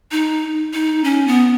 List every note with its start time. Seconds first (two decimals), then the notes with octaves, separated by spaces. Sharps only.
0.11 D#4
0.73 D#4
1.04 C#4
1.27 B3